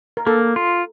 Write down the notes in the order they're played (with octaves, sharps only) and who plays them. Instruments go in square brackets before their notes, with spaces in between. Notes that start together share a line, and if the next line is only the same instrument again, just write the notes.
[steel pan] A#4
[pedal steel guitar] A#3 [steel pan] A4
[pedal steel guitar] F4